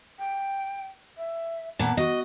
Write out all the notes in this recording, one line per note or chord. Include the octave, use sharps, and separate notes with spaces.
G5
E5
A#2 B3 A5
F#4 D#5